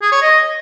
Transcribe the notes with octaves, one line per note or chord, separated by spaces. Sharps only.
G#4
C#5
D#5